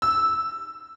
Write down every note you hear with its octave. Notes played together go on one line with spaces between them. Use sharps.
E6